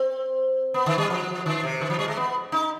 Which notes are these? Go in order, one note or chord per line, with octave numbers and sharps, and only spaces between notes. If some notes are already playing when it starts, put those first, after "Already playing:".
Already playing: C4
B3
D#3
G3
F3
D#3
C3
D#3
F3
G3
G#3
B3
D#4